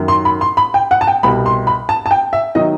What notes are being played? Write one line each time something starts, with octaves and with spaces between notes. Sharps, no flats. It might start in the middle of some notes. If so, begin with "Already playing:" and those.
Already playing: F#2 D#3 F#3
C6
B5
C6
B5
G5
F#5
A5
G5
C2 B2 G3 B5
C6
B5
A5
A5
G5
E5
D#3 F#3 D#5